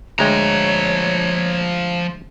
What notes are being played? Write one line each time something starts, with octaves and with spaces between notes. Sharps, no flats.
D2 F3 G#3 C#5 G5 A#5